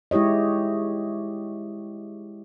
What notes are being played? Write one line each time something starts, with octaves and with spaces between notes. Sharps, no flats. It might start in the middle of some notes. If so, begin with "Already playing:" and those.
G#3 E4 G4 C#5 D#5